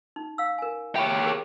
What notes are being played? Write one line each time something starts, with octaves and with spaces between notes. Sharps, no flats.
D#4
F5 E6
A#4 G#5
G4 C#5 E5 B5
G#4 A#4